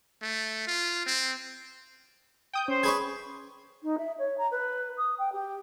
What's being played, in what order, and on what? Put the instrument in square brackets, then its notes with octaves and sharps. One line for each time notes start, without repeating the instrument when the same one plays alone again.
[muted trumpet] A3
F4
C4
[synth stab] G5 D#6 G6
[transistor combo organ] C#4 [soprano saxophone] C5
[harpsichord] G#4 B4 C#5 [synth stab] G#6
[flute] D#4
E5
C#5
A#5
B4
D#6
G5
G4